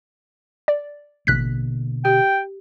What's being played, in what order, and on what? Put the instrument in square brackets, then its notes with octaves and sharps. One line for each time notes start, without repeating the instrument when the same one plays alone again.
[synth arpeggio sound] D5
[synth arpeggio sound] A1 F#6 B6 [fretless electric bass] B2 D3 A#3
[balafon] G4 [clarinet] G5